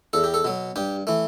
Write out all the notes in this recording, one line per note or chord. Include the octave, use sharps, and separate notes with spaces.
E2 A4
G4
A4
B2 F#3
G2 G4
E3 A3